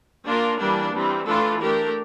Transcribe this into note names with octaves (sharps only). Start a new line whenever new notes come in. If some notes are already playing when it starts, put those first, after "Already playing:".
A#3 D4 F4 A#4
E3 G3 A#3 D4
E3 G3 C4
E3 A3 D4 F4 A4
A3 D4 G4 A#4